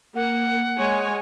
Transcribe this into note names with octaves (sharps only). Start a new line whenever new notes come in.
A#3 F#5
G#3 C#5 G#5